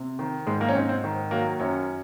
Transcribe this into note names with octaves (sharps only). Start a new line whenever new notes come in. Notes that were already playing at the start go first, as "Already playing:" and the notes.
Already playing: C3
D#3
G#2 G#3
A#3
C#4
G#2 C4
C4
D#3
F#3 A#3
F#2 C#4